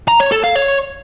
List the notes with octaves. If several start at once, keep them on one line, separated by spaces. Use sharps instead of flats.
A#5
C#5
A4
F5
C#5